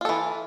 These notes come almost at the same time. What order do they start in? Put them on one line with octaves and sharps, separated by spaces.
F4 A4 E3